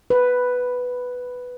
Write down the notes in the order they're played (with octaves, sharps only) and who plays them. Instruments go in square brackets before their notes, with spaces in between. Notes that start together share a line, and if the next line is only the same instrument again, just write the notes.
[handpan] B4